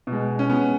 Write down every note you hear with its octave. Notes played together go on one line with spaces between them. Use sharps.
B2
G#3
C#4
B2 G#3 B3